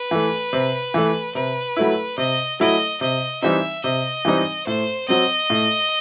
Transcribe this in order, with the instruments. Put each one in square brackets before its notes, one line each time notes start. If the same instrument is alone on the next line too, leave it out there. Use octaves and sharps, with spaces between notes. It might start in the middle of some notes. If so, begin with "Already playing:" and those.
Already playing: [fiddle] B4
[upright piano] E3 A3
C3
E3 A3
[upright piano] C3 [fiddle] B4
[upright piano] F#3 A3 E4
[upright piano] C3 [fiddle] D#5
[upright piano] F#3 A3 E4 [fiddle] D#5
[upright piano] C3 [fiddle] D#5
[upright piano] E3 G3 C4 D#4 [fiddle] E5
[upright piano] C3 [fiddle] D#5
[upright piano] E3 G3 C4 D#4
[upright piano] A2 [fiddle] C5
[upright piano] F#3 C4 [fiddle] D#5
[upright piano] A2